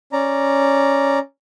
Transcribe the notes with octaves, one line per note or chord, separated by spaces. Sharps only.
C#4 D5 A#5